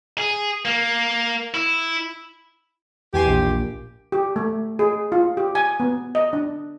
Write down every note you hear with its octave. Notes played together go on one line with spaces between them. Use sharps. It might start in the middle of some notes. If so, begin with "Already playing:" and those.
G#4
A#3
E4
E2 G4 G#5 C6
A#1
G4
A3
G#4
F4
G4
G#5
B3
D#5
D4